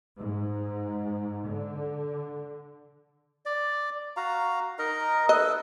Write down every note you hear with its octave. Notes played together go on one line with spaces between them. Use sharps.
G#2
D3
D5
F#4 F5 A#5
D#4 A#4 D#5
A4 B4 D#5